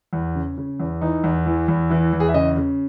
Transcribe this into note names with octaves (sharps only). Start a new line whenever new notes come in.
E2
C#3
C#3
E2
E3 D#4
E2
E3
E2
E3 E4
E2
G#4
E5
C#3 D#5
C#3